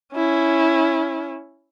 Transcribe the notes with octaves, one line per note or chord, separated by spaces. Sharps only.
C#4 E4